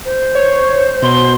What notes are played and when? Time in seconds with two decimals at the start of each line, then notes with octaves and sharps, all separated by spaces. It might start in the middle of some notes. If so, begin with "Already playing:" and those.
0.05 C5
0.35 C#5
1.02 B2 C6